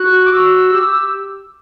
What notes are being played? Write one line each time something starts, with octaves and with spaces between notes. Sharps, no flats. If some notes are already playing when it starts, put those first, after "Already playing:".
Already playing: F#4 F#6
D6
F#4 E6
G4